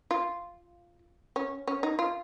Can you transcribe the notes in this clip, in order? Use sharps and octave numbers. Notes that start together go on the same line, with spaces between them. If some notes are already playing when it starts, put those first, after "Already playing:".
F4
C#4
C#4
D#4
F4